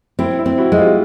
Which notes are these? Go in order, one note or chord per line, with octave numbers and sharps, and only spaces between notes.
C4 E4
E4
C4
E4 F#4
G#3
F4 G4